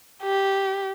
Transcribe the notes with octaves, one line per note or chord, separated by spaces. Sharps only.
G4